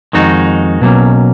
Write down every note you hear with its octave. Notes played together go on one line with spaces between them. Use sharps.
F2 D#3 G#3 D#4 F#4
B2 F#3 A#3 C#4